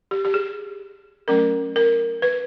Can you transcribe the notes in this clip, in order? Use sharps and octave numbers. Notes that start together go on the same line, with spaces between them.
G4
G4
G#4
F#3 A3 C#4 A#4
A#4
B4